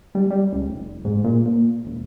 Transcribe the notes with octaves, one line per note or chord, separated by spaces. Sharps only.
G3
G3
C#2
F1
G#2
A#2
A#2
E1